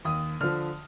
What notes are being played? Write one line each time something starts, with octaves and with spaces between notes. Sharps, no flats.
D#2 D#6
D3 F3 F6